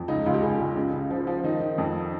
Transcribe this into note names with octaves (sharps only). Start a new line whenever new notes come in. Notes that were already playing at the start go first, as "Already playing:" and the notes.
Already playing: F2
C#2 D#4
C#2 F4
G4
C#2 G#4
C#2
C#3
C#3
F3
F3
D#3 D#4
D#3
F2